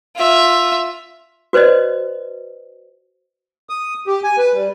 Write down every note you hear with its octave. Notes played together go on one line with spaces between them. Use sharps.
F4 E5
F#4 B4 C5 D5 D#5
D#6
G4
G#5
B4
G3